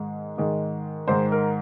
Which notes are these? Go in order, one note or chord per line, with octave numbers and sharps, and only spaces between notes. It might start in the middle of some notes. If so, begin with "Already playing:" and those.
Already playing: G#2 D#3 G#3
G#2 D#3 G#3
G#2 D#3 G#3 C5
A#4